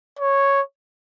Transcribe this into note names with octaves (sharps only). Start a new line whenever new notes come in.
C#5